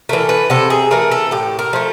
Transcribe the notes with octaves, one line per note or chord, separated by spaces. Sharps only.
E3 A3 A#4
B4
C3 A4
G#4
E3 A3 A#4
A4
A2 G4
A#4
F3 A3